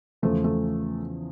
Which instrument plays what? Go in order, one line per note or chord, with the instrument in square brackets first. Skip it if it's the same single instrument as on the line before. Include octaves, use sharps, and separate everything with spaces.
[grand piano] E2 C#3 F3 [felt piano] A3
[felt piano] A3